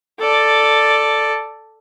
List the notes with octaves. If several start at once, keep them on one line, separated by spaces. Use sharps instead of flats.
A4 D5